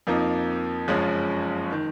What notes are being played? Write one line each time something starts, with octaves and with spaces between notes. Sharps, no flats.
F2 F3 A#3 D#4
F#1 F#2 F3 G#3 C#4
D#3